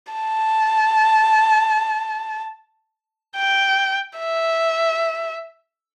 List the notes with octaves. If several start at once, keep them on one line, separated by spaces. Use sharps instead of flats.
A5
G5
E5